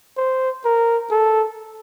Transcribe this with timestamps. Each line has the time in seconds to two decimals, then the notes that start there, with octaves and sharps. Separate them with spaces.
0.17 C5
0.65 A#4
1.11 A4